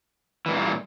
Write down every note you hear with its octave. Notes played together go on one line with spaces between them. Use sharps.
G2 A#2 E3